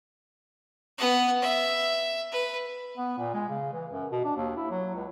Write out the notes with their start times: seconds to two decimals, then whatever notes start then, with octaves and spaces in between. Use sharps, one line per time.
0.98 B3 F#5
1.42 E5
2.32 B4
2.97 B3
3.18 A#2
3.34 G#3
3.49 C#3
3.73 E3
3.92 F#2
4.11 B2
4.24 D4
4.36 D#2
4.57 E4
4.71 F#3
4.95 C#2